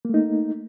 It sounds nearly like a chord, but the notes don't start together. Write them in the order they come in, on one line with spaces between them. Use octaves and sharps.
A#3 A3 D#4